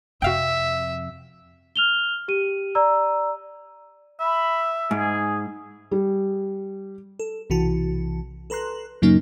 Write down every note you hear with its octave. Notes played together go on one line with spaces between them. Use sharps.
F2 C3 F#4 E5 F5 G5
F6 F7 G7
G4 D#7
D5 A#5 E6
E5 B5
G#2 G#4
G3
A4
B1 C3 E3 F#4 A5
A4 B4 A#5 C6 F#6
F#2 A#2 C#3 F#3 A#3 D#4